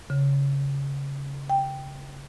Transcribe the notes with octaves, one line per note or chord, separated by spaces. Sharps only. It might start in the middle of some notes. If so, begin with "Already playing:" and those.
C#3
G5